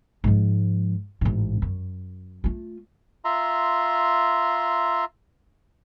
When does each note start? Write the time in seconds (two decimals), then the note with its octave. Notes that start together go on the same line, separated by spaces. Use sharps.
0.24 G#2 F3
1.21 A1 G#2
1.62 F#2
2.44 A3 F4
3.25 F4 E5 A#5 C6